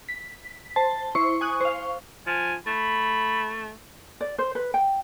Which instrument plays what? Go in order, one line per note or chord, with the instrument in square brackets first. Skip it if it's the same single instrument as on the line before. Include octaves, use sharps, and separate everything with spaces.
[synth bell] B6
[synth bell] C5 [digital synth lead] A5
[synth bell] E4 C5 [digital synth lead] C#6
[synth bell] G#5 D#6 F#6
C5 F5
[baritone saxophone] F3 [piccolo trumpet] G#5
[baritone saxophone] A3 [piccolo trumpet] B5
[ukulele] D5
C5
B4
G5